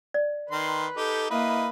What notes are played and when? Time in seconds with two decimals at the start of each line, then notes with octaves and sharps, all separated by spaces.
0.14 D5
0.51 D#3 B4 C6
0.96 D#4 G4 A4
1.31 A#3 E4 B4 D#5